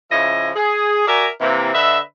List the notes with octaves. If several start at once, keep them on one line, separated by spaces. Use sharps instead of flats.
C#3 F3 E4 D#5 E5
G#4
F#4 A#4 D5 E5 G#5 A#5
C3 E3 A#3
D3 B4 D#5 E5